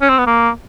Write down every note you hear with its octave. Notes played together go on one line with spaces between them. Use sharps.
C#4
C4
B3
A#3